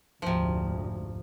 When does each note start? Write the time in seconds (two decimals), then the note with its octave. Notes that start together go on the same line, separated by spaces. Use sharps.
0.22 F1 D2 G#2 C3 F3